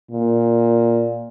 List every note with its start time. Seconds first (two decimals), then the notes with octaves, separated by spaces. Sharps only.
0.11 A#2